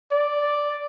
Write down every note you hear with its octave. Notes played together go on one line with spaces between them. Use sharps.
D5